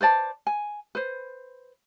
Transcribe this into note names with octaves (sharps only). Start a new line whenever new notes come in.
B4 C5 D5 A5
G#5
B4 C5